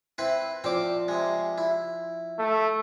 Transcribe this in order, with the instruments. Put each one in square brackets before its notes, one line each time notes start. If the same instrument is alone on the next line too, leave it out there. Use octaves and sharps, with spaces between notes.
[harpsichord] C4 E4 B4
[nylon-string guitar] F3 D5 [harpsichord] C4 D6
[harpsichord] C3 G#3
E4
[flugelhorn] A3